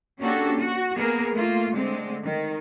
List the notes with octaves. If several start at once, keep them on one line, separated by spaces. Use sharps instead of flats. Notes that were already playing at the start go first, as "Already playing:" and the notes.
A#3 C#4 D4 F#4 G4 A4
F#4
A#3 B3 G#4 A#4
A3 A#3 F4
D3 G#3 A3 C4
D#3